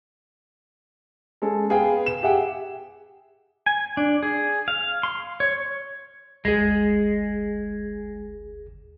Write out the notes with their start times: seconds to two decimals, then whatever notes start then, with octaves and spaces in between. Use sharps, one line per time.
1.42 G#3 C#4 A4
1.70 B3 G#4 B4 F5 G5
2.06 E7
2.23 G4 G#4 E5 F#5 G5
3.66 G#5
3.97 D4
4.23 G#4
4.68 F5
5.03 C6
5.40 C#5
6.45 G1 D2 G#3 G#4